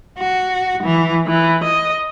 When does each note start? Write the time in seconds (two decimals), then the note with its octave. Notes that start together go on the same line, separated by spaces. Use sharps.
0.19 F#4
0.83 E3
1.28 E3
1.65 D#5